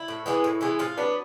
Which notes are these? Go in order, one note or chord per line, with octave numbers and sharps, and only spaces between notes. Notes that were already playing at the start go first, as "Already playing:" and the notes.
Already playing: E4
A2
E3 G#3 B3
A2
E3 G#3 B3
A2 F4
F#3 B3 D4